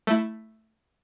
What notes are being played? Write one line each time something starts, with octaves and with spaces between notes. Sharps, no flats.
A3 E4